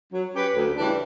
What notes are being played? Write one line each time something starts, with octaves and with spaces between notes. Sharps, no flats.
F#3
C#4 G4 B4
D2
C#3 E3 G3 D4